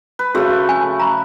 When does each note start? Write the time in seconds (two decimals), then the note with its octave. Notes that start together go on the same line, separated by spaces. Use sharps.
0.19 B4
0.35 C#3 A3 F#4 G#4
0.69 G#5
1.00 A#5 B5